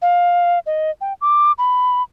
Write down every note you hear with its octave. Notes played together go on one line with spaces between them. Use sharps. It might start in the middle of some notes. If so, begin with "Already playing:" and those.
F5
D#5
G5
D6
B5